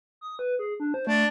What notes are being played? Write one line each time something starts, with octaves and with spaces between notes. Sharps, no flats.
D#6
B4
G#4
D4
C5
A3 D4